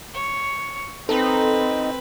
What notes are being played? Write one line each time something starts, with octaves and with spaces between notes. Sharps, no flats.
C#5
C4 D#4 A4 B4